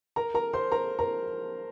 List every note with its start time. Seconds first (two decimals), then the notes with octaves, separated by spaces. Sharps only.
0.16 A#4 A#5
0.34 A#4 A#5
0.53 C5 C6
0.72 A#4 A#5
0.99 A#4 A#5